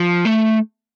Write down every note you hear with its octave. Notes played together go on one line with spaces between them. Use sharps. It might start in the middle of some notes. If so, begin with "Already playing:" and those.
Already playing: F3
A3